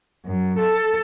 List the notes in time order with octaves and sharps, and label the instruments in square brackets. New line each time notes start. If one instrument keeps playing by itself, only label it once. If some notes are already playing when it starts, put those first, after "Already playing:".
[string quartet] F#2
A4